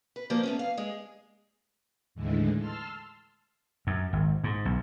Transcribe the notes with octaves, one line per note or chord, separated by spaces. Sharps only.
B4
F3 A#3 C5 D5
A3 B3 C#4
F5
G#3 G#4
D#2 A2 D3 E3 G#3
A5 C6 E6 F6
F#2
G#1
G#2
B1